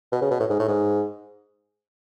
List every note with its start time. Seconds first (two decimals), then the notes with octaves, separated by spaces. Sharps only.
0.12 B2
0.22 C#3
0.31 B2
0.40 A2
0.50 G#2
0.59 A2
0.68 G#2